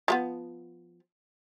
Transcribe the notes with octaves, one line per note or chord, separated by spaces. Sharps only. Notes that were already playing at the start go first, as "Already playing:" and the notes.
F3 A3 B3